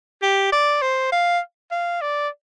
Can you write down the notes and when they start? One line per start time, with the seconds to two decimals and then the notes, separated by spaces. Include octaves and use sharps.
0.22 G4
0.52 D5
0.81 C5
1.12 F5
1.71 F5
2.01 D5